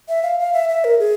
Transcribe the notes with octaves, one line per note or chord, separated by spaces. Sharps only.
E5
F5
F5
E5
E5
A#4
G#4